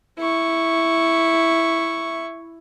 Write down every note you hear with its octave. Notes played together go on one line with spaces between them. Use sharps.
E4 C#6